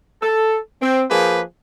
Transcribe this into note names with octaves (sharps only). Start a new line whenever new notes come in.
A4
C4
F3 A#3 G#4 B4